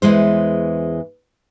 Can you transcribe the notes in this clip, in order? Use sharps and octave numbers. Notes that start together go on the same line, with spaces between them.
E2 E3 G#3 C5